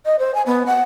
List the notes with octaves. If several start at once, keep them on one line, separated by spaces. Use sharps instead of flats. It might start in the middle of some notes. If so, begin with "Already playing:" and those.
D#5
C5
G#5
B3
F#5